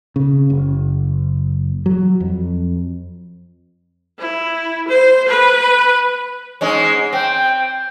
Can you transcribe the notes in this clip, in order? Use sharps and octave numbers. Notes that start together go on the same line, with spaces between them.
C#3
F#1
F#3
F2
E4
C5
B4
G#2 G#3 C#4
C4 G5